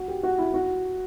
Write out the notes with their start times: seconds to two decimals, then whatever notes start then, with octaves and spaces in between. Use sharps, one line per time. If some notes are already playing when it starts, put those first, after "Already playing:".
Already playing: F#4
0.08 G4
0.23 F#4
0.38 E4
0.54 F#4